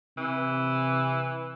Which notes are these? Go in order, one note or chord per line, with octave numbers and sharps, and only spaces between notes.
C3 E3